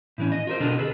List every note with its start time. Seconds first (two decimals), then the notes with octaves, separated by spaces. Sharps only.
0.18 A2 E3 C#4
0.32 D#5
0.47 F4 A#4 C5
0.60 B2 D3 D4 A4 A#4 D#5
0.79 G#4 A4 B4